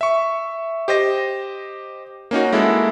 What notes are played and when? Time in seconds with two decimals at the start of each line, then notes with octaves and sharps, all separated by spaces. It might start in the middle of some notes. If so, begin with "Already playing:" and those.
0.01 E5 C#6
0.88 G4 C5 D#5 A#6
2.31 A#3 C#4 D#4 F#4
2.52 G#3 A#3 E4 F#4 A4